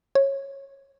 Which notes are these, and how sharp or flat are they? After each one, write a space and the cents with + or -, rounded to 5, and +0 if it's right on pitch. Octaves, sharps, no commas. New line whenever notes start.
C#5 -15